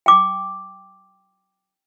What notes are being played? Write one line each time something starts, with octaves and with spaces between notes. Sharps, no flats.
G5 D6